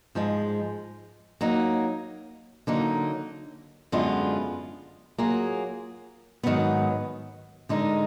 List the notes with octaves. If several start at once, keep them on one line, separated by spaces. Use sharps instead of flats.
G#2 F3 G#3
F#3 A#3 D#4
D3 F#3 A#3 D#4
F#2 D3 G#3 B3 F4
F#3 A#3 F4 G#4
G#2 D#3 F#3 B3
D3 G#3 D#4 A#4